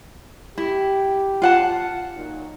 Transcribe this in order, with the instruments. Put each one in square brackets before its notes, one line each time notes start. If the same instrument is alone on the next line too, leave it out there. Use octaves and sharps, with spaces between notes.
[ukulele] E4 [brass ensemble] G4
[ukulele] F4 F#5 A5
[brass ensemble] A#2 F#3 D#4